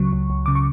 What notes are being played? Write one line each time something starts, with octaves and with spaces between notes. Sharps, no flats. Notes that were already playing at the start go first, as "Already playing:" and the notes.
Already playing: C#2 C#3 F#3 C#6
C#2
C#2
C#3 D6
C#6